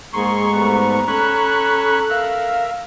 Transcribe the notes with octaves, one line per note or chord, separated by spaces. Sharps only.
G#2 A#3 G#4 A#5 C6 C#6
G3 A3 B3
C#4 A4 B5 C#6 F#6
A#4 E5 F5